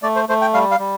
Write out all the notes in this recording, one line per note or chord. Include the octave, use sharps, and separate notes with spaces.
A3 D5
C5
A3 C5
G5
G3 F5
F5
G3